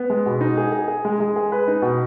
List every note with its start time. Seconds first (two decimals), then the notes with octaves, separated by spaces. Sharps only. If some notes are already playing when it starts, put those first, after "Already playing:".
Already playing: B3
0.10 G#3
0.26 B2
0.41 D#4
0.58 G#4
0.72 G#4
0.88 G#4
1.05 G#3
1.20 G#3
1.36 G#4
1.52 B4
1.68 D#4
1.82 B2